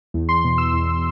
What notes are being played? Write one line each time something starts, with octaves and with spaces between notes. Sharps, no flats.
E2
C6
B2
E6
E2